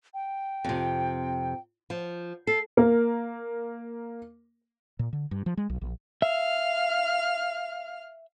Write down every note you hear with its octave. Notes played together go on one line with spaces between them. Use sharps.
G5
F2 C3
F3
A4 C7
A#3 A#4
A#2
D3
G2
F3
G#3
B1
A#1
E5 F5 F6